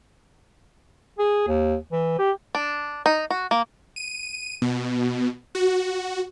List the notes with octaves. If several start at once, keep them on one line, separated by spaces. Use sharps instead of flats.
G#4
D#2
E3
G4
D4
D#4
F#4
A#3
D#7
B2
F#4